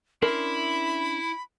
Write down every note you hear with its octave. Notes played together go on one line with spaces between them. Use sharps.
C#4 D4 E4 A#4 B5 C6